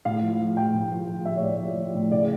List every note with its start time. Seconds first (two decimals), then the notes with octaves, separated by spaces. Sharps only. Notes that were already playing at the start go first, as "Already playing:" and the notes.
0.05 A2 F5
0.22 F3
0.40 F3
0.57 A2 G5
0.74 A2
0.91 F3
1.09 F3
1.25 A2 E5
1.36 C#5
1.43 A2 D5
1.60 F3
1.77 F3
1.94 A2
2.11 C#3 D5